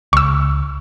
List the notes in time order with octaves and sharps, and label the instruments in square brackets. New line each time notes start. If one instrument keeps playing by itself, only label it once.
[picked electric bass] C#2 [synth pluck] C#6 E6